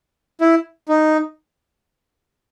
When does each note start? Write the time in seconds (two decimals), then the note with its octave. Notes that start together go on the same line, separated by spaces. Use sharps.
0.41 E4
0.89 D#4